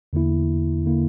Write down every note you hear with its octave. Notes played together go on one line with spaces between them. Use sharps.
E2 D3 A#3 E4
D3 A#3 E4